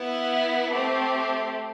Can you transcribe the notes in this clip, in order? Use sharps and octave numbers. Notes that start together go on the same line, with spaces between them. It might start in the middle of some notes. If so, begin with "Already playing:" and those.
Already playing: B3 E4 B4 F#5
A3 C4 G4